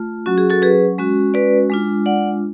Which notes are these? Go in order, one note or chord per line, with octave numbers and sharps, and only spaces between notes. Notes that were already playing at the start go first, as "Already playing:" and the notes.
Already playing: A3 F4
F#3 C#4 F#4
G#4
F#4 A4
G#4 B4
G#3 C#4 F#4
B4 D5
G#3 D4 F4
D5 F#5